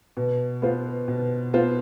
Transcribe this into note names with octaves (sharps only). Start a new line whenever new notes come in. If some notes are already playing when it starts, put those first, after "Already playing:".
B2
B3 F4 C5
B2
B3 F4 C5